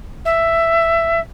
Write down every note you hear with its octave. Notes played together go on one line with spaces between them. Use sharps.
E5